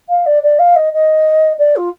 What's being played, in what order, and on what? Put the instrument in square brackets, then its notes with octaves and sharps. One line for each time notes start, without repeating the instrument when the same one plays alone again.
[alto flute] F5
D5
D5
F5
D#5
D#5
D5
F4